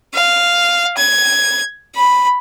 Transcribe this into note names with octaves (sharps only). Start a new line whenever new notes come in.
F5
G#6
B5